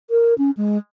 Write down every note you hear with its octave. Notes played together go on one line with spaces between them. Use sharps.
A#4
C#4
G#3